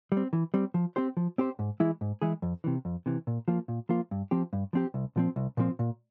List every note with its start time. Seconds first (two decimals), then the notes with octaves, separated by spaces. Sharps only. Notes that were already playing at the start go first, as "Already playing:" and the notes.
0.12 G3
0.17 C4
0.33 E3
0.54 G3 C4
0.74 F3
0.96 C4 G4 C5
1.17 F3
1.38 C4 G4 C5
1.59 G#2
1.80 E3 G#3 E4 G#4
2.01 G#2
2.22 E3 G#3 E4 G#4
2.42 F2
2.64 C3 E3
2.85 F2
3.06 C3 E3
3.27 A#2
3.48 F3 A#3 F4
3.68 A#2
3.89 F3 A#3 F4
4.11 G2
4.31 F3 C4 G4
4.53 G2
4.73 F3 C4 G4
4.94 C2
5.16 A#2 F3 C4
5.36 C2
5.57 A#2 F3 C4
5.79 A#2